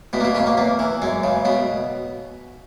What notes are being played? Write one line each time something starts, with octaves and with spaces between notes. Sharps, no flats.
E2 B2 B3
A#3
B2 B3
C#3 C#4
A#3
E2 A#3
E3
F#2 G#3
C#3
B2 B3